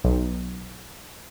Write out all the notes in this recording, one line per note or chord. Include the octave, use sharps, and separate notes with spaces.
B1